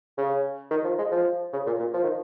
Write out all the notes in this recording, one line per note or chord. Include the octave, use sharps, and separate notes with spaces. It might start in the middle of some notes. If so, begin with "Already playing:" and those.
C#3
D#3
F3
G#3
F3
C#3
A#2
A#2
F3
D#3